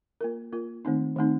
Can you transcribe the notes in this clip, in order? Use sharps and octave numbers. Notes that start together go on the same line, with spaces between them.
A#3 F4 A#4
A#3 F4 A#4
D#3 A3 C4 D#4
D#3 A3 C4 D#4